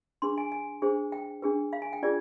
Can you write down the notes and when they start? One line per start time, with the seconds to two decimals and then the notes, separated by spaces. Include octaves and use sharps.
0.22 D4 G#4 B4 C6
0.38 G#5
0.52 G#5
0.82 D4 G#4 C5
1.12 G5
1.42 D4 G#4 B4
1.73 F5
1.82 G#5
1.93 G5
2.02 D4 F4 G#4 B4 D5